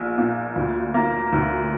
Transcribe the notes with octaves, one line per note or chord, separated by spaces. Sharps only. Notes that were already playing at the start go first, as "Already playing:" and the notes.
Already playing: A#1 A#2
A#2
D2
A#3
D2